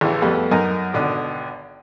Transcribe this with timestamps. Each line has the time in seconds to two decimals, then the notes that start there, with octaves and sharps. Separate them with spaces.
0.01 A1 C#3 E3
0.22 F2 G3 A3 B3
0.51 F#2 D#4 A#4 G#5
0.93 G#1 B2 D3